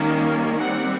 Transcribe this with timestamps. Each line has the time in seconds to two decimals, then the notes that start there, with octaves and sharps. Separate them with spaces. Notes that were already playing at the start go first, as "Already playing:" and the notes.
Already playing: D#3 G3 A#3 C#4
0.58 G3 C4 F#5